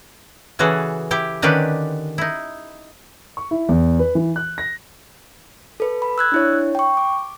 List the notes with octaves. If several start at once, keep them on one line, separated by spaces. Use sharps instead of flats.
C#3 E3 C#4 F#4 G#4 A4
E4 G4 G5
D3 D#3 C#4 D4 G4 B4
D#4 E4
C#6
E4
E2
B4
E3
F#6
A#6
A4 B4
B5
E6 F#6 G#6
D4 E4 C#5
G5 C#6
D6